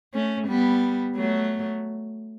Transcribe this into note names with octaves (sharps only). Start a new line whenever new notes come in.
A3 C#4
G3 B3
F#3 A3